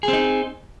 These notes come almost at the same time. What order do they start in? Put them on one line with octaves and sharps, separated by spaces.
G#4 C4 D#4